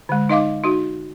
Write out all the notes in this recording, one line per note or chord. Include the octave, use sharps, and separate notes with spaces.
D3 G#3
D#4 D#5 F5 D6
D#4 F#4